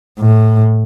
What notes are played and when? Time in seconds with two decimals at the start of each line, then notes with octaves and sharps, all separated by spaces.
0.20 A2